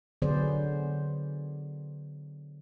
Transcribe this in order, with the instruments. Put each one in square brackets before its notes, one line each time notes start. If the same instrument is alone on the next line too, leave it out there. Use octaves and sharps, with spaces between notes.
[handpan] D3 F#3 B3 G#4 C5 D5